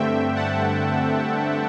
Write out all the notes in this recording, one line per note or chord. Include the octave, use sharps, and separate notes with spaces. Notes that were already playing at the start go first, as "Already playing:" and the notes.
Already playing: G2 D3 A3 C4 E5 G5
F#5 A5